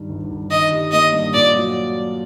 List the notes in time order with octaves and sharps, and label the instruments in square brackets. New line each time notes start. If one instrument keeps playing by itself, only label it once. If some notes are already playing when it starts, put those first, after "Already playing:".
Already playing: [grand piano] G2 D#3
G1
G1
[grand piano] D#3 [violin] D#5
[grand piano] G3
[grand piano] A#3 [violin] D#5
[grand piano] G2
[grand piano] A#2 [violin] D5
[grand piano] F#3